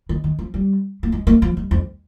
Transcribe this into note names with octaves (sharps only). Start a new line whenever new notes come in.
D#3
D#3
F3
G3
A#3
G#3
A#3
F3
G2
F2